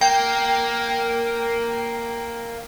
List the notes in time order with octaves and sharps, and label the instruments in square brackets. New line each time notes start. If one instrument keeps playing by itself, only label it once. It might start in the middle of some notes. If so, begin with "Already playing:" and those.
[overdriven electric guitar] A#3 [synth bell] G5